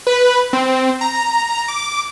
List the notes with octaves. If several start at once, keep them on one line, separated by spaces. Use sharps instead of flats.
B4
C4
A#5
D6